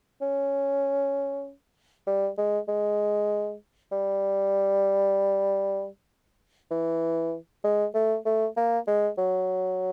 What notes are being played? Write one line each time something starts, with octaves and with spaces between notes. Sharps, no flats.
C#4
G3
G#3
G#3
G3
E3
G#3
A3
A3
A#3
G#3
F#3